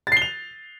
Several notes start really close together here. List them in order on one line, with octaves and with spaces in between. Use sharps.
A6 C7 G7 F7